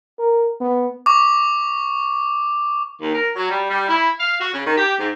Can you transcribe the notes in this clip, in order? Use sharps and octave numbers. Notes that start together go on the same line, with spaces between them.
A#4
B3
C#6 D6
D#2
A#4
F#3
G3
G3
E4
F5
F#4
C#3
D#3
G4
G#2